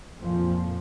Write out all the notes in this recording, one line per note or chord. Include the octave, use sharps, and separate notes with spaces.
F2 A#2 F3